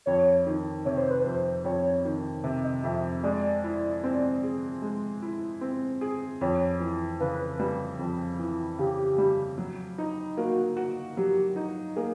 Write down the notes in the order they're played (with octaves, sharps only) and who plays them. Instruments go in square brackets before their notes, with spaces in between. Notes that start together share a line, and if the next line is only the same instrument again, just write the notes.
[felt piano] F2 [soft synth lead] C#5
[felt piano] D#3
[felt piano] C3 [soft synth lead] C#5
[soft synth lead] C5
B4
[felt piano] F2 [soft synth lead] C5
[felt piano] F2 [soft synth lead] C#5
[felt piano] D#3
C3
[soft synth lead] D#5
[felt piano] F2 [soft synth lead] E5
[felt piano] G#3 [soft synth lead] D5
[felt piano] E4
C4
G#4
G#3
E4
C4
G#4
[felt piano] F2 [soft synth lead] C#5
[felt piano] E3
[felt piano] C#3 [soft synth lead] B4
[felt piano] G3
F2
E3
[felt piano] C#3 [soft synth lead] G4
[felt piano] G3
F#3
D#4
[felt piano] A#3 [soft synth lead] F#4
[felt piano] F#4
[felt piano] F#3 [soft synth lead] G4
[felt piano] D#4
[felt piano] A#3 [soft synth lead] G#4